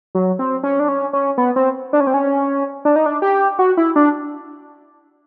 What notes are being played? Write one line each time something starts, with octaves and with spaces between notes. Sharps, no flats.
F#3
C4
C#4
D4
C#4
C#4
B3
C4
D4
C#4
C4
C#4
D4
D#4
D4
G4
F#4
E4
D4